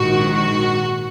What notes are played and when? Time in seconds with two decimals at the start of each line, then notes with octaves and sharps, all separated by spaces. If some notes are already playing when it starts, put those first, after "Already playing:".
Already playing: A#1 G#2 D#3 F#4
0.35 F#4